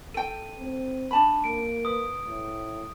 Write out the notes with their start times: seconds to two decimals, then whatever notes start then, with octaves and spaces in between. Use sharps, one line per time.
0.14 A4 G5 D#7
0.59 C4
1.11 D4 A5 B5
1.44 A#3 D7
1.85 B4 D#6
2.28 A2